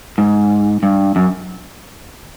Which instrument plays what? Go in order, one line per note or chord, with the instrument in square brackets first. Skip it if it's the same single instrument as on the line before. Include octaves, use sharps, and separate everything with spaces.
[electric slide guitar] G#2
G2
F#2